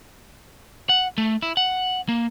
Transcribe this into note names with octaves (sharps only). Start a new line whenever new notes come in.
F#5
A3
E4
F#5
A#3